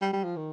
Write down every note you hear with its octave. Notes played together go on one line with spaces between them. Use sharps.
G3
G3
F3
D#3